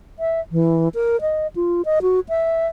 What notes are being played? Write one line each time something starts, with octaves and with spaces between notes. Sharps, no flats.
E5
E3
A#4
D#5
F4
D#5
F#4
E5